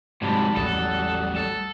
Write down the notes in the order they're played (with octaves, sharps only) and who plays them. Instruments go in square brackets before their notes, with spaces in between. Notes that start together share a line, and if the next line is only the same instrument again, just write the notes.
[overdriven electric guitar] G#2 C3 [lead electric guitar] F#3 G3 [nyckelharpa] A5 B5
[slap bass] A1 E2 [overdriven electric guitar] A4 [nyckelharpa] F#5 D#6
[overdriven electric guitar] A4